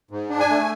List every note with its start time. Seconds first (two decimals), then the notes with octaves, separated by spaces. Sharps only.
0.11 G#2
0.30 D4
0.40 G#5
0.50 A3